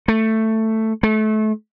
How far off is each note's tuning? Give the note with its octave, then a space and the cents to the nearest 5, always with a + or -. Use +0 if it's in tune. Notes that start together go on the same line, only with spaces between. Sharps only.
A3 +10
A3 -25